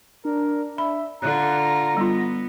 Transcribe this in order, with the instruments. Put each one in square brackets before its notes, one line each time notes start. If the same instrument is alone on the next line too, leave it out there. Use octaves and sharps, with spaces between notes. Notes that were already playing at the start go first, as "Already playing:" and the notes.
[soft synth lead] D4 [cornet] A#4
[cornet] E5 [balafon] B5
[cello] D3 F4 [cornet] A#5 [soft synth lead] F#6
[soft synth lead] A#6
[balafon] G3 F4 [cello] B3